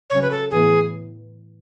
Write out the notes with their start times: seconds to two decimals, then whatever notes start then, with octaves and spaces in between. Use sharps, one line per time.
0.10 C#3 F#3 C#4 C#5
0.22 B4
0.31 A4
0.51 A2 E3 B3 G#4